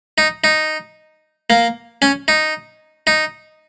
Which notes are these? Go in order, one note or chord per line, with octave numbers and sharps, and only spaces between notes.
D#4
D#4
A#3
C#4
D#4
D#4